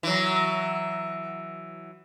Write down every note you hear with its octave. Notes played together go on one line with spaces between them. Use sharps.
E3 F#3